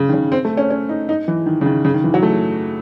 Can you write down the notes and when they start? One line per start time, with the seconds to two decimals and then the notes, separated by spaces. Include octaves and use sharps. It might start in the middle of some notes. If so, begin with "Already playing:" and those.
Already playing: C#3
0.09 D#3
0.13 C#3
0.32 C4
0.45 A3
0.57 C#4
0.71 C#4
0.89 D#4
1.09 D#4
1.28 E3
1.46 D#3
1.61 C#3
1.66 D#3
1.85 C#3
1.94 D#3
2.04 E3
2.14 F#3
2.23 A3